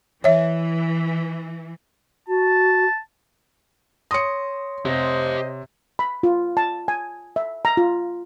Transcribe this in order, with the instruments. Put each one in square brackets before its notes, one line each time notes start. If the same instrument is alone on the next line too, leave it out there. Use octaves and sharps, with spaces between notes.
[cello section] E3 [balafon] C#5 E5
[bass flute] F#4 [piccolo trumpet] A5
[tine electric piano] C#5 C6 A#6 [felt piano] D#6 C#7
[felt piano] C3 [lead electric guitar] G4 F5 [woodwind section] C5 D#5
[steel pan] B5
F4
A5
G#5
E5
A#5
F4